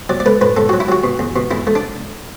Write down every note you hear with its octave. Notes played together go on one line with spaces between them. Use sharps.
F#3 D5
D5
A3 B4
A2 B4
A2 A4
F#3 F#4
E4
F#3 F#4
B2
E2
B2
E2 E4
A3
D4